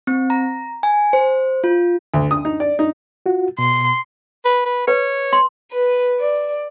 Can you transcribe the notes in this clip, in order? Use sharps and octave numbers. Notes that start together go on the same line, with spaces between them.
C4
A#5
G#5
C5
F4
D2
D#6
D#4
D5
D#4
F4 F#4
B2 C6
B4
B4
B4 C#5
C6
B4
D5